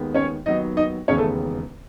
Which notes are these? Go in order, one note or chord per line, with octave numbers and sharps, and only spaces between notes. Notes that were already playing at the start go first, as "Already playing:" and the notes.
Already playing: D#2 D#3 G#3 B3
C#4 C#5
D#2 D#3 F#3 B3 D#4 D#5
D#4 D#5
E1 D#2 C#3 G#3 B3 C#4 C#5
A3 A4